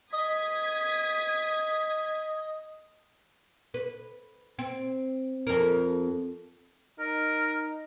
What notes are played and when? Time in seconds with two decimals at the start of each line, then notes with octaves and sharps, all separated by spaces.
0.13 D#5 D#6 G#6 B6
3.74 B4
4.59 C4
5.47 F2 A#4
6.99 D#4 A#4